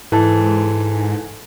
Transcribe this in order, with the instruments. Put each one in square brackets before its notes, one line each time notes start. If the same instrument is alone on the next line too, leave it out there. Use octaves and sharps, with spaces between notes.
[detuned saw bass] G#2 [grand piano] E3 [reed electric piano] A4 A5